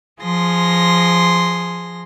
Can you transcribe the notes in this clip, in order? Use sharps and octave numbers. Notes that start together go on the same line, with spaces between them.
F3 G#4 C6 A#6